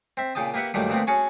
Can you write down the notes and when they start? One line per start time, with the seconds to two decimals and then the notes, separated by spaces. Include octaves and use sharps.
0.17 C4 E5
0.35 A#2 C#3 G5 A5 D#6
0.54 A#3 G4 B4 E5 F#5
0.74 G2 A#2 D#3 F#3 G3 A3
0.89 A#2 D3 A3 B3 C4
1.07 C#4 F#4 G#4 G#5 A5 C#6